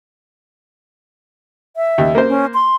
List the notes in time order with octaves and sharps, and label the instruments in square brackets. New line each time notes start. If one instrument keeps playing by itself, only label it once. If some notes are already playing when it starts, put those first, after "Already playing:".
[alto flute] E5
[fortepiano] D#2
A#3 C5
[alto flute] C#4
C6